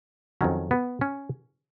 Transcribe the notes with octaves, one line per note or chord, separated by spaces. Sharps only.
F2 D#3 F#3 C#4
B3
C#4